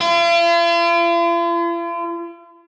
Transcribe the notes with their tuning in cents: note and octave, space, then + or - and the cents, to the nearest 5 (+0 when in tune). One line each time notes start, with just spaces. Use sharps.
F4 -45